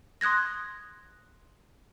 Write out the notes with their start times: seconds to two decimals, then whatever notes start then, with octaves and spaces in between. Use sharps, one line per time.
0.21 C6 D#6 F#6 G#6 A#6